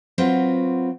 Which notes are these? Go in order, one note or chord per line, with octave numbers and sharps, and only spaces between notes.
F#3 C4 F4 F#4 B4